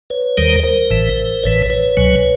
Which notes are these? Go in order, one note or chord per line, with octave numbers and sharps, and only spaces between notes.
B4 C#5
D#2 D#3 G3 A#4 C5
A#4 C5
A1 A2 E3
A1 A2 E3 B4 C#5
B4 C#5
C#2 B2 F#3